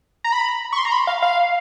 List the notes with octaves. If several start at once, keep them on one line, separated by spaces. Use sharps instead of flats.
A#5
B5
C#6
C6
A#5
B5
F5
F5